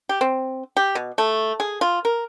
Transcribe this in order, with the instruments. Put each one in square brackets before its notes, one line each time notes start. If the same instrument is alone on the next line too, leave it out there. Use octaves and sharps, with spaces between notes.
[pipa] G4
C4
G4
B2
A3
G#4
F4
A#4